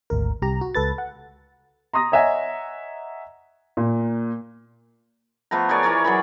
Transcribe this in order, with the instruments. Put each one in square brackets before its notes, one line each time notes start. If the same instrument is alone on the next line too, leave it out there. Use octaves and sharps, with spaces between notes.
[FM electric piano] G#1 D2 A#4
C2 G4 A#5
F#4
C#2 A4 B4 A6
F#5
[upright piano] A#5 C6 D#6 A#6
C#5 D#5 E5 F#5 G#5 A#5
A#2
[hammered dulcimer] F3 A3 B3 A#5
G#4 A#4 C#5 D5
E3 A#4 C#5 D5
F#3 G#4 B5